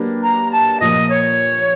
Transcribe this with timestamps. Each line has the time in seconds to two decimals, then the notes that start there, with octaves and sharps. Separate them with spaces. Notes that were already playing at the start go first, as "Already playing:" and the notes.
Already playing: F#3 A#3 D4 G4 B4
0.23 A#5
0.51 A5
0.80 A#2 F3 A#3 D#5
1.09 C#5